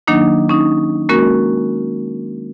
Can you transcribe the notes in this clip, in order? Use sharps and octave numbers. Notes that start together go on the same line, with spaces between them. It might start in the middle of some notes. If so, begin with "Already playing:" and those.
D#3 F#3 A#3 D4 D#4
C#4 D#4
G#3 A#3 C#4 F#4 A#4